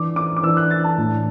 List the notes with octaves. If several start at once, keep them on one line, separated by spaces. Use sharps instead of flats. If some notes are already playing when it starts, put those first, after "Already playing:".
Already playing: E3 D4 D6
D6
D6
E3 D4 E6
F#6
A6
A5
A2 E3 D4